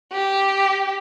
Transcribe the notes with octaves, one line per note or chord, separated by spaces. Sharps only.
G4